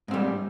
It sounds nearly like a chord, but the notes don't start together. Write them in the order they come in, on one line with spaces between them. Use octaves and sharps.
G#2 C4 G3